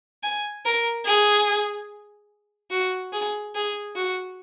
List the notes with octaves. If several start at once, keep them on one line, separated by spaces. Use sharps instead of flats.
G#5
A#4
G#4
F#4
G#4
G#4
F#4